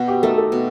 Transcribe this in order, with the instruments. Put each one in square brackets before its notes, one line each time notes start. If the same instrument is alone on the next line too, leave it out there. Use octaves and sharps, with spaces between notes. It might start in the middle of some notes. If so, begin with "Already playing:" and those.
Already playing: [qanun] B2 [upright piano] F#4
[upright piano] G4
[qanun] A3 D#4 [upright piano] A4
[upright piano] A4
[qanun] B2